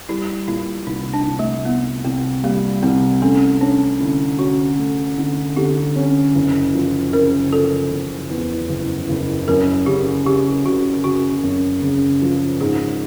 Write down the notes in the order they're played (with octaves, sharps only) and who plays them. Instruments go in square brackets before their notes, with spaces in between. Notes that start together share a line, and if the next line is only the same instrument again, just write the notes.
[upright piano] G3 [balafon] E4
[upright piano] A#2 [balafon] E4
[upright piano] C2 [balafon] D#4
[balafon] D4
[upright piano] C2
[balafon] A3
[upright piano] C2 [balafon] B3
[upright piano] C2 [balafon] C4
[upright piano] G3 [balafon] A#3
[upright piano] C2 [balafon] C4
[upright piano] A3 [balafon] C#4
[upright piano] C#4 [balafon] D4
[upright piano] D3 [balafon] E4
[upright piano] C#4 [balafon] F#4
[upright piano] A3
D3
[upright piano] D3 [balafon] G4
[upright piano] C#4
F#1
F3
[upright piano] C#3 [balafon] A#4
[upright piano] F3 [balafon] A4
[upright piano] F#1
E2
F#1
F#1
[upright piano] F#2 [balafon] A#4
[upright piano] C#3 [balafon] G4
[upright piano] C#3 [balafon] G4
[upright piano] C#3 [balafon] F#4
[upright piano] C#3 [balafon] F#4
[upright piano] F#2
C#3
F3
[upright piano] G#2 [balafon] G#4